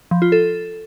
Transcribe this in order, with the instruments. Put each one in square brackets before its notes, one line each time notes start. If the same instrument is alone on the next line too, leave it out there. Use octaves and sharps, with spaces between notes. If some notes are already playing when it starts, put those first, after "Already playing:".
[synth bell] F3
F4
A4